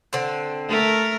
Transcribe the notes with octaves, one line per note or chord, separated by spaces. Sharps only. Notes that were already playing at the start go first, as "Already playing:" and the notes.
D3 C4
A3 A#4